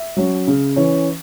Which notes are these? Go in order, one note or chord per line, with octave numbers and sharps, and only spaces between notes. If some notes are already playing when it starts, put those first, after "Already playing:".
Already playing: E5
F#3 C#4
C#3
E3 C#4